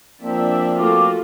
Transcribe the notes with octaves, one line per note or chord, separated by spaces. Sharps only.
F3 A#3 C4 D4 E5
A3 F4 F#4 D6